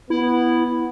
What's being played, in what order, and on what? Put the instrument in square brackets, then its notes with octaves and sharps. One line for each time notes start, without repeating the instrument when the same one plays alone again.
[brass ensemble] B3 [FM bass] E4